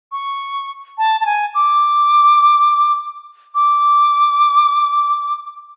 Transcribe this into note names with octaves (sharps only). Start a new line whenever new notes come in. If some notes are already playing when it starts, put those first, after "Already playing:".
C#6
A5
A5
G#5
D6
D6